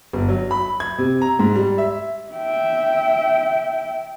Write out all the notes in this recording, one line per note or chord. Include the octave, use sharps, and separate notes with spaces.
G1
F#3
B5
G#6
C3
A#5
G#2
G3
E5
E5 G5